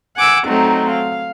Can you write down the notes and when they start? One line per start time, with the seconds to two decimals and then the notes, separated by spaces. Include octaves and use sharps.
0.16 F#5 G#5 D6 E6
0.47 F#3 A3 C4 D#4
0.91 F5